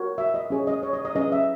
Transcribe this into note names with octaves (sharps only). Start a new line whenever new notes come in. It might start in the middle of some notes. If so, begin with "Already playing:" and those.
Already playing: F#4 A#4 C#5
E5
D#5
C#4 G#4 C#5
D#5
C#5
D#5
D#5
C#4 G#4 B4 D#5
E5